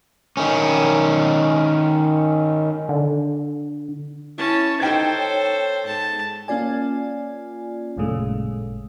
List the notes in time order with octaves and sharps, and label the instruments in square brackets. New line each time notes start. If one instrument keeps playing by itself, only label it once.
[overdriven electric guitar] D#3 C#4
[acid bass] D3
[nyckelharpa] C#4 A5 [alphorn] E4
[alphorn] D#4 [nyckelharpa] A4 C5 [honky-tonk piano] G5 G#6
[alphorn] C#5
[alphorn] G#2 [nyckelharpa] A5
[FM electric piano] A#3 C#4 F4 D5 G#5
A1 F#2 A#2 C#3 G#3 A3